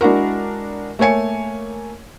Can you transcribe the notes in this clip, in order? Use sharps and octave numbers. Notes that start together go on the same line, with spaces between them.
G#3 D4 E4 F#4 A#4
A3 A#3 C#5 G#5 C#7